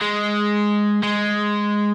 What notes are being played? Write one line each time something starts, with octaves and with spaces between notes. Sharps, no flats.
G#3
G#3